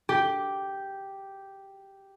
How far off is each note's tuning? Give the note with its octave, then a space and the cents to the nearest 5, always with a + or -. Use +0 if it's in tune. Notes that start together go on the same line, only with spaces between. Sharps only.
G4 -5